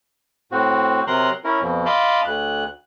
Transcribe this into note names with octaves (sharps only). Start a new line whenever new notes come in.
A2 C4 F#4
C3 F#3 A#4 A#5 C6 F#6
C#4 E4 A#4
F2 B2
D#5 F5 A5 B5 C6 D6
D2 F#6